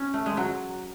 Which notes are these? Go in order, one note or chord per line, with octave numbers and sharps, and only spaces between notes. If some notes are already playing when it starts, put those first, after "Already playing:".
Already playing: C#4
A3
G#3
F#3